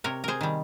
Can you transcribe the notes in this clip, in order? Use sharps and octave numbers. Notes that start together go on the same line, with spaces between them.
C3 A#4 C#5
G#4 A#4 C5
D#3 G3